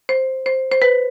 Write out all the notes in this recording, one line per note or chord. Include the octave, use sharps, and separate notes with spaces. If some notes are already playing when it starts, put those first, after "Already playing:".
C5
C5
C5
B4